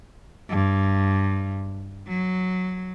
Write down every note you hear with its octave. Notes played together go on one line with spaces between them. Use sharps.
G2
F#3